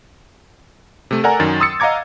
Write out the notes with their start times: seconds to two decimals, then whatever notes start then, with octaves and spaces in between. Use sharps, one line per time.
1.11 C3 A3
1.24 A4 A#4 D5 F#5 G#5 A#5
1.40 F#2 D#3 A6
1.60 C6 D#6 E6 A6 C#7
1.80 D#5 F5 F#5 A#5 D6 G#6